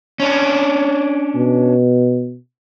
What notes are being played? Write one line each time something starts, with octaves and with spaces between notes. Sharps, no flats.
C#4 D4
B2